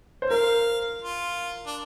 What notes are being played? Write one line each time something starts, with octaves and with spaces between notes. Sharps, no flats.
C5
A#4 F5
F4
D4